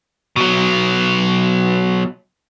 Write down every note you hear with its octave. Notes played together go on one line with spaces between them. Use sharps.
B2 F#3